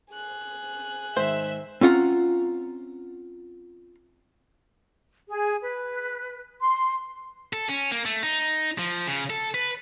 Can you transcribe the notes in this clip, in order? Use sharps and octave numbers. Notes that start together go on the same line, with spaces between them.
G#4 F#6
G#2 D#3 C5 E5
C4 C#4 F4 F#5 A#5
G#4
B4
C6
A4
C#4
A#3
A3
D#4
F3
C#3
A4
B4